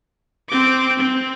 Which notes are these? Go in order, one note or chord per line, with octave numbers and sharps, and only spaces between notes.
C4 D6
C4